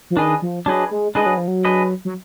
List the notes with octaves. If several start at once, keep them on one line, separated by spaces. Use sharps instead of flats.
F3
D#3 D4 G#4 B4 D#5
F3
F#3 D4 G#4 B4 D#5
G#3
G#3 D4 G#4 B4 D#5
F#3
F3
F#3
D4 G#4 B4 D#5
F#3